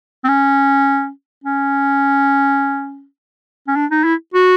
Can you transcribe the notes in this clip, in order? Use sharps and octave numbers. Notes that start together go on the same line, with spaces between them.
C4
C#4
C#4
C#4
D4
D#4
E4
F#4